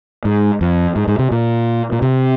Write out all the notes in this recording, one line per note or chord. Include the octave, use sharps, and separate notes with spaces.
G#2
F2
G#2
G#2
C3
A#2
A#2
C3